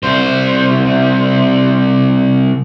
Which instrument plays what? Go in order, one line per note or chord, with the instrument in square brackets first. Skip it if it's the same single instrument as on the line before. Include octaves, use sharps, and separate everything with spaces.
[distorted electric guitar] C2 C5